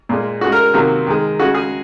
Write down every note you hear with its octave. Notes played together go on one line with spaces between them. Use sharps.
A#2 G#3
C#3 G#3 F#4
A#4
C3 D#3 F#3 A#3
D#3 G#3
C#3 G#3 F#4
G#4